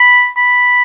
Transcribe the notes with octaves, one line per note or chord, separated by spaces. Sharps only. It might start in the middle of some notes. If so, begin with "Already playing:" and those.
Already playing: B5
B5